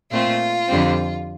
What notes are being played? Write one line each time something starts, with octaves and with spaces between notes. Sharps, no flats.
A#2 A3 C4 F4
F2 D3 G3 C4